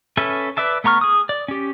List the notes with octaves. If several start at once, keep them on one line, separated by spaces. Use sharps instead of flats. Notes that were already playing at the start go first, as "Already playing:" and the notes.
C#4 A4 B4 E5 G#5
B4 D5 E5 A5
A3 B3 A#5 C#6 F6
G#4 D#6
D5
C#4 G4